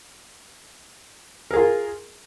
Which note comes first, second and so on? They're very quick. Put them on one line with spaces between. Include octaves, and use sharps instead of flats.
A#4 G#4 F4